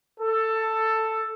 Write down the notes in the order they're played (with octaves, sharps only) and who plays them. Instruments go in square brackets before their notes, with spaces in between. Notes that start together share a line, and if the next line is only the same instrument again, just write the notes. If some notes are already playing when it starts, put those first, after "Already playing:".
[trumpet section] A4